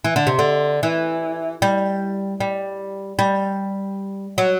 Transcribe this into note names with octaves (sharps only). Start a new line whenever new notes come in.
E3
D3
C3
D3
E3
G3
G3
G3
F#3